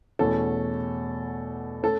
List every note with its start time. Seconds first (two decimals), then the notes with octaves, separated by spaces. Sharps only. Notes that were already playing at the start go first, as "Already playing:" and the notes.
0.19 E2 B2 A3 C#4 A4
1.83 A3 C#4 A4